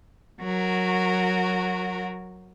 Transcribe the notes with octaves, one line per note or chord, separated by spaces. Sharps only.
F#3 F#4 A#4